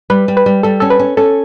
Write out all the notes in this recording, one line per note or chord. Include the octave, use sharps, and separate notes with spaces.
G3 B4
G3
B4
G3
G3 A4
C#4 A4
B4
C#4
C#4 A4